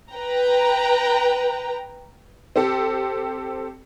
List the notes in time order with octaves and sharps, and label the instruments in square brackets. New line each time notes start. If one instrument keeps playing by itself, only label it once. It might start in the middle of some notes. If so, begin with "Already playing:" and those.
[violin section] B4 G5 A#5
[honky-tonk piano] C4 G4 A4